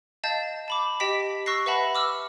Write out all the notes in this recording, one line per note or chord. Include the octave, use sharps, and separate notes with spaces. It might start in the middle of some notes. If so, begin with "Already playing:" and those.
D#5 F5 A5 G6 A6
A5 B5 D6
G4 D#5 G5 B6
C#6 E6 F#6 A#6 C7
B4 E5 F#5 A5 B5
D6 E6 F6